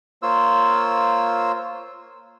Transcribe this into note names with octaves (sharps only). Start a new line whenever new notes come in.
A#3 F4 C5 C#5 E6